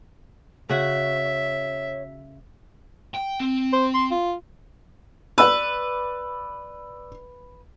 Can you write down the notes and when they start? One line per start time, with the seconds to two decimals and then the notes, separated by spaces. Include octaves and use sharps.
0.69 C#3 F#4 C#5 E5
3.14 G5
3.40 C4
3.73 C5
3.94 C6
4.11 F4
5.38 B4 D5 E6